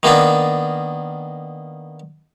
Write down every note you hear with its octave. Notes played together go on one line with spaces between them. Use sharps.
D#3 A#3 B3 D4